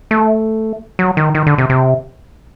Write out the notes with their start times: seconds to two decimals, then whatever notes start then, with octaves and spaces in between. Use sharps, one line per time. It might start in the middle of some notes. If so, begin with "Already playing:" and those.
0.11 A3
0.99 F#3
1.17 D#3
1.35 D#3
1.47 D3
1.58 C3
1.70 C3